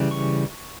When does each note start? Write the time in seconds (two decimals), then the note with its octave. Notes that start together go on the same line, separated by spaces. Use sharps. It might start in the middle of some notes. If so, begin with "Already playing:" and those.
Already playing: C#3 E3 G3
0.11 C#6